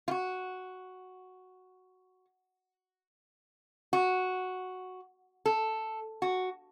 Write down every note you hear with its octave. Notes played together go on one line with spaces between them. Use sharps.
F4
F#4
F#4
A4
F#4